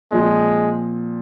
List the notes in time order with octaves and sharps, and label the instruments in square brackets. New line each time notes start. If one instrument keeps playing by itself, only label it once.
[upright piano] A#2 F3 C4 [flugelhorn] G#3